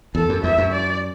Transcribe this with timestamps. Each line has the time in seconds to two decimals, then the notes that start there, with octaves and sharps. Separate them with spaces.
0.15 E2 A4
0.29 F#2
0.43 E2 E5
0.58 F#2
0.73 D5